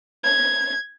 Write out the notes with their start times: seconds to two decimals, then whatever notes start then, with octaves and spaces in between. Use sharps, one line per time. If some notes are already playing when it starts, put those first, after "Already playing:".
0.24 G#6